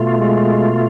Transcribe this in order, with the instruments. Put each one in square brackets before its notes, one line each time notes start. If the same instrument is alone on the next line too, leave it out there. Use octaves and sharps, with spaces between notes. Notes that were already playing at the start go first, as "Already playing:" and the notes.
Already playing: [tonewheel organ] B2 A3 F4
[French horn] G#3